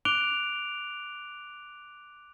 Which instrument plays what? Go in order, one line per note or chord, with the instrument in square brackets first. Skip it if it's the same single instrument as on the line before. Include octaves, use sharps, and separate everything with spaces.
[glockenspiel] D6 F#6 D7 F7 G7